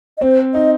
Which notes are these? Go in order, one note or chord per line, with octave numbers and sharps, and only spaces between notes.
D#5
C4 C5
D#4 D#5